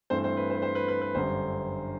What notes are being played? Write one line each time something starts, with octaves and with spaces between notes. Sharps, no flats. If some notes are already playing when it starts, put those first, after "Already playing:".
G2 E3 A3 C4 C5
C5
B4
C5
B4
C5
B4
B4
B4
G1 F#2 D3 G3 C5